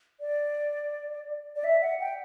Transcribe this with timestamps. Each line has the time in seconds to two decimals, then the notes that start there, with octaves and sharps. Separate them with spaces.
0.20 D5
1.56 D5
1.64 E5
1.82 F#5
2.00 G5